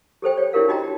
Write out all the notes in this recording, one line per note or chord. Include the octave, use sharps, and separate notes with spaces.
G4 A4 C5 G5
C#5
D4 E4 G4 A#4 F5
D#4 F#4 D#5 G5 A#5